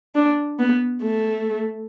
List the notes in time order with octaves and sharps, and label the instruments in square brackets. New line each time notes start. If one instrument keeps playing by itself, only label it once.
[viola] D4
B3
A3